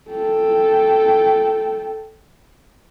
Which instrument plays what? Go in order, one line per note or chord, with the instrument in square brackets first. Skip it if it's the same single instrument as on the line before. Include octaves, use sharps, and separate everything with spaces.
[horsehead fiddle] A4 G5